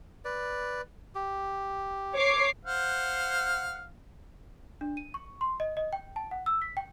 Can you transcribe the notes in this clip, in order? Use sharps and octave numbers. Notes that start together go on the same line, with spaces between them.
B4 D5
G4
C#5 D6 C7
C5 F5 F#5
D4
D#7
C#6
C6
D#5
D#5
G5
A5
F#5
E6
B6
G5